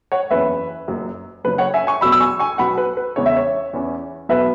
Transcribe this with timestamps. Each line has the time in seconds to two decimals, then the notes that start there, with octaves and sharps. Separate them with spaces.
0.12 C#5 F#5
0.31 F#1 E2 E3 C#4 B4 E5
0.88 F#1 F#2 F#3
1.44 F#1 F#2 C#3 F#3 B4
1.58 C#5 F#5
1.74 E5 G#5
1.87 G#5 C#6
2.01 E2 B2 F#3 B3 B5 E6
2.12 E6
2.20 G#5 C#6
2.39 G#5 C#6
2.58 B1 B2 B3 F#5 B5
2.78 B4
2.97 B4
3.16 E2 C#3 G#3 B3 C#5
3.26 E5
3.37 C#5
3.73 E2 E3 C#4
4.29 B1 B2 B3 B4 E5